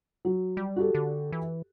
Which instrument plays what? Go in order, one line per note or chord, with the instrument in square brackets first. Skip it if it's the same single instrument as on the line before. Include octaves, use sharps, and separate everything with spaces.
[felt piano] F#3
[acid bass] G3
[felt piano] F#4 G4 A4
[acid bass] D3
E3